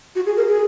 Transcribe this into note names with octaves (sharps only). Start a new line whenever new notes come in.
F#4
G#4
A#4
G#4